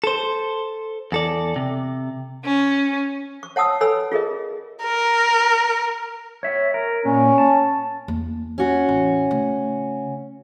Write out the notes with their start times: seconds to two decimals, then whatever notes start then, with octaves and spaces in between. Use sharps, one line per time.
0.04 A4 C5
1.12 E2 A4 D5
1.56 C3
2.45 C#4
3.43 C#6
3.56 C#5 F#5 A5 D#6 E6
3.80 A4 B4 C#5 G#5 B5 E6
4.12 F4 G#4 A#4 D#5
4.84 A#4
6.43 C#5 E5
6.74 A#4
7.05 A#2 C#4
7.38 A5
8.08 E2 A#3
8.58 C#4 F#4
8.88 A1
9.31 C#3 A3